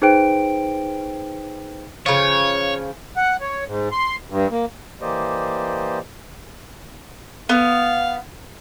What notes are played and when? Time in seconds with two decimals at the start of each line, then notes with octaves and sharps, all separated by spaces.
0.02 D#4 G#4 B4 C5 G5 D7
2.06 C#3 F3 C#5
3.17 F#5
3.41 C#5
3.66 G#2
3.92 C6
4.30 G2
4.51 A#3
5.01 E3 A#3 G4 C5 D5 D#5
7.49 B3 F5